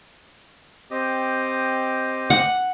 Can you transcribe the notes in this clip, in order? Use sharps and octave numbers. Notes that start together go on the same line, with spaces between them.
C4 G4 D#5
F#5